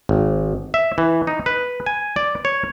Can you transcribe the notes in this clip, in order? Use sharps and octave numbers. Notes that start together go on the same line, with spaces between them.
G#1
E5
E3
D#4
B4
G#5
D5
C#5